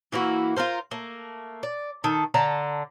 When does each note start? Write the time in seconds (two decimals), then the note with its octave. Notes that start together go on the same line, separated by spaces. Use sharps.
0.12 E3 A#3 E4 F#4
0.56 F4 G4 A#4 C5
0.91 A3 A#3
1.63 D5
2.04 D#3 A4
2.34 D3 A5 A#5